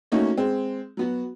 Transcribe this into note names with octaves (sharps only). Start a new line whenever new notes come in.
A3 A#3 C#4 D#4 F#4
G#3 C4
F#3 B3 F#4